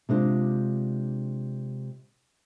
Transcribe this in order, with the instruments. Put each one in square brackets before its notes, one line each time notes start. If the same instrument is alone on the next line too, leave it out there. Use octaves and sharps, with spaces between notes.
[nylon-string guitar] C3 G#3 D4 F4